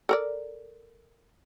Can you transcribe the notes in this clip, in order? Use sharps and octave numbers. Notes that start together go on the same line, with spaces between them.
A4 A#4 D5